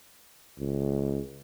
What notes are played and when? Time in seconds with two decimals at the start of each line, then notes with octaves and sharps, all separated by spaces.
0.59 C#2